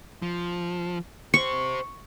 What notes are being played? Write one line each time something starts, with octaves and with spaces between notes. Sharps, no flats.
F3
G4 C5 C#6